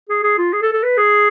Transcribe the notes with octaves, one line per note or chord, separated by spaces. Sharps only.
G#4
G#4
F4
G#4
A4
A4
B4
G#4